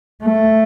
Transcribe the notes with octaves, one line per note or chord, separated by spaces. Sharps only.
A3